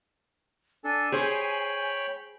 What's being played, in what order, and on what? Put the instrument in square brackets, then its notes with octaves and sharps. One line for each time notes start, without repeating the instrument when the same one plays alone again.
[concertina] D4 A4 [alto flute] G#5
[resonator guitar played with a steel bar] G#4 C5 [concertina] C#5 G5 B5